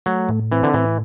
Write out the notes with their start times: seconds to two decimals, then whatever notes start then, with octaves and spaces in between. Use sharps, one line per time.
0.06 F#3 A3
0.29 A2
0.52 E3 C4
0.63 D3
0.74 A2 E3